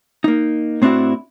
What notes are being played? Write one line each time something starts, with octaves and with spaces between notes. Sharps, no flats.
A#3 D#4
A2 C4 D4 E4 F#4